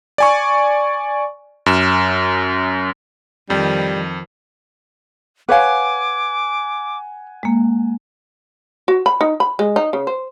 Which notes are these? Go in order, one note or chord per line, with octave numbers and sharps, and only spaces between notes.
D5 G#5 C#6
F#2 E7
F2 D#3 F3 G3
B4 C#5 F5 F#5 G#5 D6
G#3 A#3
F#4
B5
D#4
B5
G#3
D#4
C#3
C5